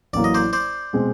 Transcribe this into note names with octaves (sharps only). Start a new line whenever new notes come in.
A1 A2 F#3 A#3 D5
D#5
C5 D5
C5 D5
B2 G#3 C4